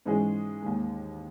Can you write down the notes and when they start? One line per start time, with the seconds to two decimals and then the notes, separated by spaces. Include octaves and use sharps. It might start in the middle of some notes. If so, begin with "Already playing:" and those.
0.06 G#2 E3 G#3 C#4 G#4
0.63 D#2 D#3 G#3